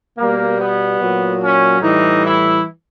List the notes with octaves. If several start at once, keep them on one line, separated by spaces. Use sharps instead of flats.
B2 G3 A#3
B3
A#2 F#3
C#4
A2 E3 G3 D#4
E4